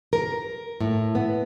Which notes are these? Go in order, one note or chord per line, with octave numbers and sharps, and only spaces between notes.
A#4
A2
B3